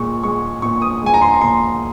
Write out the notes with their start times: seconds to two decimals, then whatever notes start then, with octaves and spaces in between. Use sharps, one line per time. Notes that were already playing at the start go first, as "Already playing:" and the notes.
Already playing: A#2 G#3 C#6
0.23 G#3 C#6
0.62 A#2 C#6
0.82 D#6
1.02 G#3 G#5
1.14 A#5
1.22 C6
1.34 A#5
1.41 A#2 C6